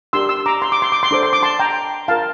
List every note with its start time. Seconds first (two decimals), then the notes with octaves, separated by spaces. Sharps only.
0.13 D4 G4 A#4 C6 E6
0.29 C6 E6
0.46 A#5 D6
0.62 C6
0.72 D6
0.82 C6
0.92 D6
1.03 C6
1.11 D4 A4 C5 D6
1.23 C6
1.33 D6
1.43 A5 C6
1.59 G5 A#5
2.08 D4 F4 A#4 F5 A5